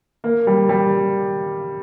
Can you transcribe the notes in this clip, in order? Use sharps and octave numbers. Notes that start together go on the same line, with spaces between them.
A#3
G3
G3